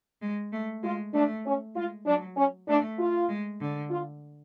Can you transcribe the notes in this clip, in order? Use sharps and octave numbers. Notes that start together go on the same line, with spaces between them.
G#3
A3
G#3 F4
A3 D4
C#4
G#3 F4
F#3 D4
C#4
A3 D4
F4
G#3
D3
F4